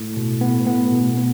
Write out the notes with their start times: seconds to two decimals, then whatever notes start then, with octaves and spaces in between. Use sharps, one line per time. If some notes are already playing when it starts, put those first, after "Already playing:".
Already playing: A2
0.17 B2
0.41 B3
0.67 B3
0.92 B2
1.17 B3